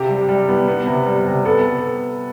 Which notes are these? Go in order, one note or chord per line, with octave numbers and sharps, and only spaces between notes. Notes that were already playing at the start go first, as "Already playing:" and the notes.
Already playing: C3 G4
G3
G3
B3
B3
C3
G3
C3
B3 A4